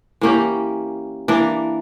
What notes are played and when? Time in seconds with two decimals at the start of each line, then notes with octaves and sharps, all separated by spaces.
0.21 E3 A#3 C#4 G4
1.28 E3 A#3 D4